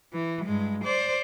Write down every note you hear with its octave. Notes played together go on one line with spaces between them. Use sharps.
E3
G2 G#3
C5 D5